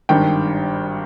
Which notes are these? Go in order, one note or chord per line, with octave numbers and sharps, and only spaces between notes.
G#1 G2 D#3 G5